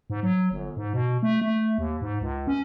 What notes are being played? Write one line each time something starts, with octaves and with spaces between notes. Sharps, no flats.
G#2
F#3
G1
G#2
B2
A3
A3
D#2
G#2
C#2
C#4